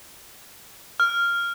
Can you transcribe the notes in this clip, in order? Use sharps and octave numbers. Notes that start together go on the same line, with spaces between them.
F6